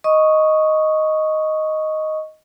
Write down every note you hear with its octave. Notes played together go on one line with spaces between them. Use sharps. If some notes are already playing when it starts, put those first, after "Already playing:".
D#5 C#6 D#6